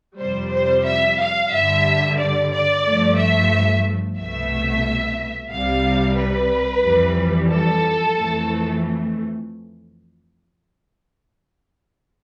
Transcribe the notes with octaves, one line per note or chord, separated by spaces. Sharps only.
F2 C3 G3 C5
C5
E5
F5
G2 D3 G3 E5
D5
D5
G2 F3 A3
E5
C2 B2 A3 E5
C2 C3 G3 F5
B4
F2 E3 G3
A4
F2 E3 A3